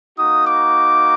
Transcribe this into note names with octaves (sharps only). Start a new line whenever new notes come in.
A#3 D#4 F#4 D#6
D6